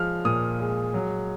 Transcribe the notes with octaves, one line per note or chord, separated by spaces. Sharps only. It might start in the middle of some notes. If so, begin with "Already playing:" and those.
Already playing: F3 G#3 F6
A#2 D#6
G#3
F#3